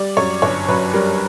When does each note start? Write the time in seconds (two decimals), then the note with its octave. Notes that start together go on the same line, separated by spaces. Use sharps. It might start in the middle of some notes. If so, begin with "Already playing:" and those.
Already playing: G3 D5
0.17 F#2 C#5
0.42 G1 C#5
0.68 F#2 B4
0.93 G3 A#4